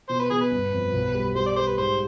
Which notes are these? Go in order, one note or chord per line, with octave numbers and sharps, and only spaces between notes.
B2 C5
B4
B2 G#4
B4
G1
F2
B1
G3
G3 C5
D5
G3 C5
B4
G#2 C5